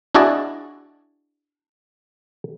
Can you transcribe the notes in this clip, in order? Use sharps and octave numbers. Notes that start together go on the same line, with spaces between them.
D4 E4 F#4 G#4 D5 D#5